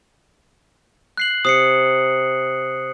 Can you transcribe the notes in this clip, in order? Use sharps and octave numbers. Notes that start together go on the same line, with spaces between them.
F#6 C7 F#7
C3 D#6 C7 C#7